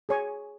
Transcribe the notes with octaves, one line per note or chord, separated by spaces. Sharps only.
G#4 C#5 G#5 C#6